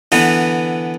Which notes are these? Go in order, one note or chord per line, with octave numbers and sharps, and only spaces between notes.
D3 E3 B3